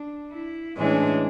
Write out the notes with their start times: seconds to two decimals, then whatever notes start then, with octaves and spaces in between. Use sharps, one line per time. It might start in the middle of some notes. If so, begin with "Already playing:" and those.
Already playing: D4
0.31 E4
0.76 A2 E3 G#3 C#4 D4